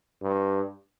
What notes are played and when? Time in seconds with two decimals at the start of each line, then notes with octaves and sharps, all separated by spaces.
0.22 G2